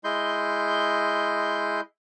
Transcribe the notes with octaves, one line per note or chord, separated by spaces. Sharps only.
G#3 E4 D#5 C6 G6